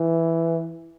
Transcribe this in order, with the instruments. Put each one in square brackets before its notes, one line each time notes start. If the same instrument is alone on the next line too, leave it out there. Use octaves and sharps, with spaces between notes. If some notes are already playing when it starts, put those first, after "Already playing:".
Already playing: [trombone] E3